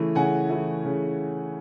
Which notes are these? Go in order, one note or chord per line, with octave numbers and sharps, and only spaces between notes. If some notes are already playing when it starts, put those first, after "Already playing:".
Already playing: C#3 E3 A3
C#3 F#5 G#5
E3 A3
C#3